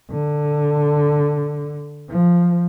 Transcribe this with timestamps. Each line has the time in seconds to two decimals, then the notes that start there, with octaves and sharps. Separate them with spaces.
0.10 D3
2.09 F3